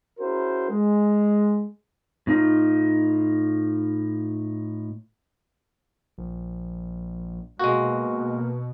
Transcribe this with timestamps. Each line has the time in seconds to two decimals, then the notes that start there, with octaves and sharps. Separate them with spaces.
0.19 C#4 E4 F#4 G#4 A#4 C5
0.70 G#3
2.27 A2 D#4 F4
6.18 A#1
7.59 B2 G#3 A#3 F#4